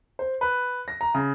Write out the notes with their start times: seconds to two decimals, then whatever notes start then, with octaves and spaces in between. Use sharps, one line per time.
0.19 C5
0.41 B4
0.88 A#6
1.01 A#5
1.14 C#3